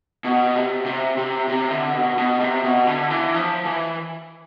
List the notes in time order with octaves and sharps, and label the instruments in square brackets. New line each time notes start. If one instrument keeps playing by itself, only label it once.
[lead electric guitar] B2
C3
C3
C3
C3
D3
B2
B2
C3
B2
D3
E3
F3
E3